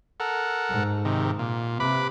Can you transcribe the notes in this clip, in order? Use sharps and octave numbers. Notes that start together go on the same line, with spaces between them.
A4 A#4 F#5
G#2
C3 D#3
A#2
C3 B4 B5 D6